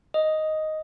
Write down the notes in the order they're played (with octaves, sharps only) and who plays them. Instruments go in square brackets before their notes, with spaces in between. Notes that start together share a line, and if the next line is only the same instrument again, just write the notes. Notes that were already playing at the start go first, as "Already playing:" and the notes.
[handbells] D#5